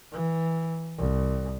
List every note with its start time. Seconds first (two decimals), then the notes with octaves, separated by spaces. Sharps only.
0.12 E3
0.98 C2